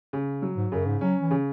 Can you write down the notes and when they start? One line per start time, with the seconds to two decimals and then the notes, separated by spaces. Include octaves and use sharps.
0.13 C#3
0.42 F#3
0.57 G#2
0.72 F#2 C#3
0.86 G#2
1.01 F#3 C#4
1.22 E3
1.31 C#3